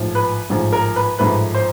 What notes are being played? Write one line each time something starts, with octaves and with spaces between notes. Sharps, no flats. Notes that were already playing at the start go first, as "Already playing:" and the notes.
Already playing: A1 G#2 F3
B4
A1 G#2 F3
A#4
B4
A1 G#2 F3 A3 B4
C5